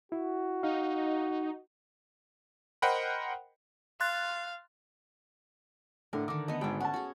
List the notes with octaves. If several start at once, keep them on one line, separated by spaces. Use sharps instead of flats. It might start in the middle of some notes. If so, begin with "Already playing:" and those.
E4 F#4
D#4 F5
A#4 C5 D#5 F#5 G5 B5
F5 C6 F#6 A6
A2 D3 A#4
D3 D#3 D6
A3 B3 D#5
G#1 G#2 D4 G5
C#4 F#5 A5
F#4 G#4